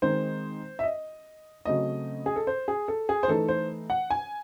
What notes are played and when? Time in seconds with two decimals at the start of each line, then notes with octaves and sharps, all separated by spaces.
0.02 D#3 G#3 C4 D#4 C5
0.79 E5
0.83 D#5
1.65 C#3 F#3 A3 C4 D#5
2.26 G#4
2.36 A4
2.47 C5
2.68 G#4
2.88 A4
3.09 G#4
3.23 C5
3.28 E3 A3 D#4 A4
3.49 C5
3.90 F#5
4.10 G#5